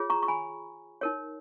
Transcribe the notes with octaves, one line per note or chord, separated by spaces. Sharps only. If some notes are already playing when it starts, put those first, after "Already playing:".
Already playing: F4 G#4 C#5
A#5 C#6
C#6
G#5 B5
D#4 A#4 C#5